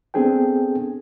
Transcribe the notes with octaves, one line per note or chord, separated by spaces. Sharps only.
B3 C4 D4 G#4 A4 G5